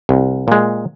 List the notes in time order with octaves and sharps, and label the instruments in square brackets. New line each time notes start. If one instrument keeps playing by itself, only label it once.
[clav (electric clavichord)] C2
A#2 G#3